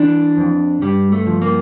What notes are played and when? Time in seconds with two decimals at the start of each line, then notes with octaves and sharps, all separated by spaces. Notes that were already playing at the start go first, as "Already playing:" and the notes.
Already playing: E3 D4
0.37 F2
0.81 G2 G3
1.12 A3
1.27 F3
1.42 A#3